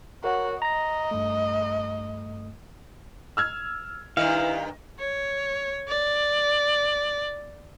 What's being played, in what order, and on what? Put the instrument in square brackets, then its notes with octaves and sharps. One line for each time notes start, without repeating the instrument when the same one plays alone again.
[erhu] F#4 [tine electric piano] A#4 C#5 F#5
[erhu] D#5 [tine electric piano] A#5 A#6
[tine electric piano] G2 A3
[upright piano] E6 F6 G#6
[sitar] G2 D#3 [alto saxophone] E4 [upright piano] D#5 [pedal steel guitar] F5
[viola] C#5
D5